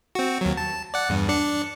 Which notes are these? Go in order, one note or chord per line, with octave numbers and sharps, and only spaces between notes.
C4 F#4
D#2 F#3
A5
D5 F#5
E2 G2
D4 D5 C#7